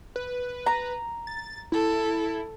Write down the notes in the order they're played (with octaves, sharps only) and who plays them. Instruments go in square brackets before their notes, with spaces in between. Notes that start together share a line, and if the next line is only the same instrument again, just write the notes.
[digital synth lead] B4
[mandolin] A#5
[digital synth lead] A6
[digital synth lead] E4 [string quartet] A4